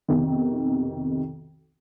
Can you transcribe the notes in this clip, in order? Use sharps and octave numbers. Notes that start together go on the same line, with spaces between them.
B1 F2 C3 D#3